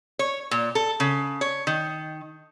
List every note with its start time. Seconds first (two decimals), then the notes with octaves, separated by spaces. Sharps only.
0.19 C#5
0.51 A#2
0.75 A4
1.00 C#3
1.41 C#5
1.67 D#3